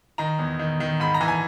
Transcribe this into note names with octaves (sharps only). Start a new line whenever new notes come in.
D#3 A#5
E2
D#3
D#3
G#2 B5
A#5
E3
G#5